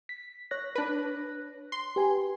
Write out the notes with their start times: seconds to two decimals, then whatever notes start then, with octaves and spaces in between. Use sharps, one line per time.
0.09 B6
0.51 C#5 F#6 A#6
0.75 D4 B4
1.72 C6
1.96 G4 B4 G#5